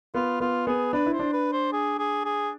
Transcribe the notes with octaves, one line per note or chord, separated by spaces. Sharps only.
B3 F4
B3 F4
B3 G#4
D4 B4
E4
C5
D4
B4
C5
G#4
G#4
G#4